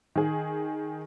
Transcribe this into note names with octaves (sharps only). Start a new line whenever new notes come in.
D#3 G#4